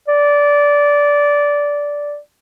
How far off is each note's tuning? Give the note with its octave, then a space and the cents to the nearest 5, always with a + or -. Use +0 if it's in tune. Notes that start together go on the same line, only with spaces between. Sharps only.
D5 -15